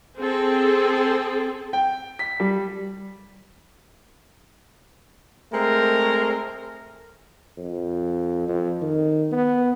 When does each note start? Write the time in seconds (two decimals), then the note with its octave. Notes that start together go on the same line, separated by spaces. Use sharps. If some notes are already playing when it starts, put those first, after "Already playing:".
0.18 C4 G#4 A4
1.73 G5
2.19 B6
2.40 G3
5.53 G#3 A3 C4 A#4
7.57 F2
8.48 F2
8.82 D#3
9.32 B3